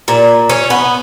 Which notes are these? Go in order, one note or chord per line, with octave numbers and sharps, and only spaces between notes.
A#2
C#4
B3